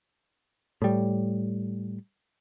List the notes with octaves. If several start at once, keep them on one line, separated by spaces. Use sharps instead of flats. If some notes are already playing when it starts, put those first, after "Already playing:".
A2 G3